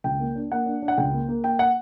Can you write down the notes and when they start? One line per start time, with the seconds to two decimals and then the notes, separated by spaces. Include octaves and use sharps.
0.04 C#2 G5
0.19 A#3
0.35 D4
0.52 A#3 F#5
0.66 D4
0.82 D4
0.88 F#5
0.97 C#2 G5
1.13 A#3
1.29 A#3
1.44 A#3 G5
1.59 F#5